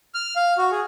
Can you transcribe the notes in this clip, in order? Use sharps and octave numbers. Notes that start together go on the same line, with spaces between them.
F6
F5
F#4
G#4